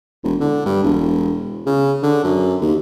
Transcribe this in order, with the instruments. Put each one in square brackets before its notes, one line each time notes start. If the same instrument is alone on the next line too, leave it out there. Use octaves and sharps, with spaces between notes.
[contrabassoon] E1
D3
G2
E1
C#3
D3
F#2
D#2